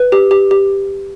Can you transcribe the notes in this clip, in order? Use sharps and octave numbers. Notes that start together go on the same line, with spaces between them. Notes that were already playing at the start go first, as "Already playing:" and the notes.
Already playing: B4
G4
G4
G4